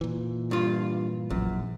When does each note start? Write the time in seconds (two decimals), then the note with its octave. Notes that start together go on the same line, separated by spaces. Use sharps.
0.01 A#2 E3
0.51 G2 F4
1.30 A#1 F#2